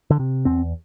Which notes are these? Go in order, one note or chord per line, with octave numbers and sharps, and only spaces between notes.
D3
C3
E2 C4